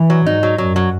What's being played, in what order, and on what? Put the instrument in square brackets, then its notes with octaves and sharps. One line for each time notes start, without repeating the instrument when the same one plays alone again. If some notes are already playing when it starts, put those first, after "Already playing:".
Already playing: [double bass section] E3
[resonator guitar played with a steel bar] F#3
[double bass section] G#2 [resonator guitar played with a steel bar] D#4
[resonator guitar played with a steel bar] F#3
[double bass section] F#2 [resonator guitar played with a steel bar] F#3
[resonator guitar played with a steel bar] F#3